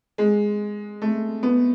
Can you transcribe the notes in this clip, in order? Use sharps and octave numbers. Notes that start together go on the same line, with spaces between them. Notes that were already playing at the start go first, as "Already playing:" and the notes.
G#3
A3
B3